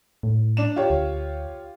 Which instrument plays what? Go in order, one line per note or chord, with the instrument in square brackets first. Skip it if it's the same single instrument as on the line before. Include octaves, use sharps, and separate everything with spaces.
[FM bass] A2
[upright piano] D4 E7
F4 G4 C#5
[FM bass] D2